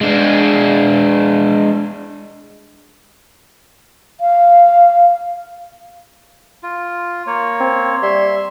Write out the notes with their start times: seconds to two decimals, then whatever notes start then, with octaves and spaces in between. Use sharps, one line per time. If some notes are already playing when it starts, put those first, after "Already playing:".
0.01 G#3 D4
4.21 F5
6.63 F4
7.27 A#3 C#5
7.60 C4
8.02 G3 E5 C6